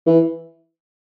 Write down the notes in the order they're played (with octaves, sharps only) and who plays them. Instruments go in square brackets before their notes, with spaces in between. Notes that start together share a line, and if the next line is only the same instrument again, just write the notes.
[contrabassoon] E3